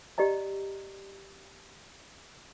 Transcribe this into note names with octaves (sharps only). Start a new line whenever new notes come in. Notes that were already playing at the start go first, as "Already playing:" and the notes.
G4 D5 D#5 A#5